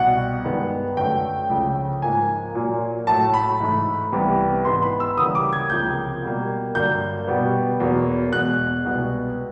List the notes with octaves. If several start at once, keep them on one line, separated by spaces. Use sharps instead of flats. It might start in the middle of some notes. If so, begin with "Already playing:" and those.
Already playing: C2 B2 G3 F#5
G2 D#3 G#3 B3
F#2 D3 F#3 A3 G5
C#2 C#3 F3 A3
G#2 F3 A#3 G#5
A#2 F#3 A#3
A2 F#3 A3 A5
B5
G#2 E3 A3
C2 C3 E3 G3 B3
G#2 E3 G#3 B3 C6
B5
E6
D2 C#3 E3 G3 A#3 D#6
D6
G#6
C#2 C3 F3 A#3 G6
B2 G3 A#3
G2 D3 F#3 A#3 G6
B2 G3 B3
E2 B2 F#3 A#3
E2 B2 G#3 F#6
C2 B2 G#3 B3